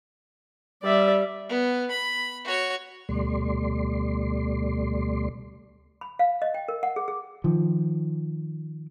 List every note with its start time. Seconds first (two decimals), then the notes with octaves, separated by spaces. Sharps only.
0.83 G3 D5 E5
1.49 B3
1.91 B5
2.45 F#4 C#5
3.09 D2 B2 G3 A3 D5 C6
6.01 B5
6.19 F5
6.42 D#5
6.54 G5
6.68 A#4
6.83 F#5
6.96 G#4
7.08 G#4
7.44 D#3 F3